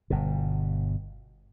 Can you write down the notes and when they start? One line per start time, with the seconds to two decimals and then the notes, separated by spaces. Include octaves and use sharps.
0.10 G1 B2